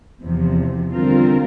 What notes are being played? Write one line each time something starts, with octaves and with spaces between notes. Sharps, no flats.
E2 C3 F3
D3 G3 C4 F4 A#4